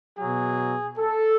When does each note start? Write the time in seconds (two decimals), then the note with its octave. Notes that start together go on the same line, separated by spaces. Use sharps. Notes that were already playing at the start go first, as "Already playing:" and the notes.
0.19 B2 F#3 G#4
0.99 A4